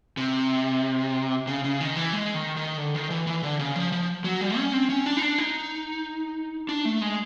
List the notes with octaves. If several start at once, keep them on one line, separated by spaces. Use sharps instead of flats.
C3
C#3
C#3
D#3
E3
G#3
D#3
D#3
D3
D#3
E3
E3
D3
C#3
F3
F3
F#3
G3
C#4
C4
C#4
D4
D#4
D4
D#4
D4
A3
G#3